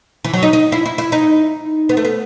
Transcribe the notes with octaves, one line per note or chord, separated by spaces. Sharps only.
E3
F#3
D#4
D#4
E4
E4
E4
D#4
B3
A3
B3